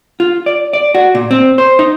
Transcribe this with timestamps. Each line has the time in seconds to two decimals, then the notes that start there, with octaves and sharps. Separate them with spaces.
0.20 F4
0.46 D5
0.73 D5
0.95 F#4
1.15 A#2
1.31 C4
1.58 C5
1.79 D#4